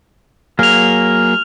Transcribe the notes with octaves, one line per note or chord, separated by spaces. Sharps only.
F#3 A#3 G#4 F6 F7